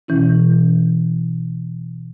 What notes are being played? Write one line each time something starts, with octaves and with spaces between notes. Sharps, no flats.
B2 E3 C#4 E4